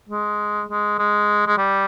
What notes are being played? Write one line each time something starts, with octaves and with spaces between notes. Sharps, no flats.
G#3
G#3
G#3
G#3
G3